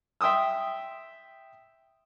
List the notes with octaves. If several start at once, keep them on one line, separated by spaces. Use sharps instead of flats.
E5 G5 C6 D#6 E6